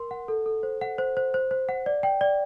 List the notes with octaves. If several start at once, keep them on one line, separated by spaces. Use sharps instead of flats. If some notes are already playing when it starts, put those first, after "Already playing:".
Already playing: A#4 C6
F#5
A4
A4
C5
F#5
C5
C5
C5
C5
F#5
D5
G5
D5